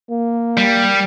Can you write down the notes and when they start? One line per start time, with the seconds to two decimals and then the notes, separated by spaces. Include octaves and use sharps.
0.10 A#3
0.57 G3